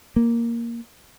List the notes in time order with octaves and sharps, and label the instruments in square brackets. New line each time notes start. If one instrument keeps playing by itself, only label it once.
[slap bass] A#3